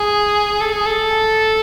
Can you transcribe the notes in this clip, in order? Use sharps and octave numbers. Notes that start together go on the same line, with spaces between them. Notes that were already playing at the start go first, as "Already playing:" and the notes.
Already playing: G#4
A4
G#4
A4